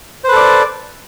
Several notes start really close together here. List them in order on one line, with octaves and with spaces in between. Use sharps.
C5 B4 A4 D5